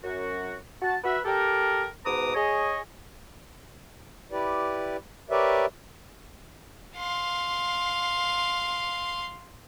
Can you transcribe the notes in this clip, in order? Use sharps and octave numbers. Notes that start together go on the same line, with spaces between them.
F#2 F#4
F#4 A5
F#4 B4 E5
G4 A4 A#4
G#2 B2 B4 A#5 D6 D#6
G#4 C#5 D#5
E4 G4 B4 D5
G4 A#4 B4 C#5 D5 E5
F5 C6